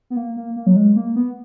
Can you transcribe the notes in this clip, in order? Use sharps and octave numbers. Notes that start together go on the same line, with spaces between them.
B3
A#3
A#3
A#3
F#3
G#3
A#3
B3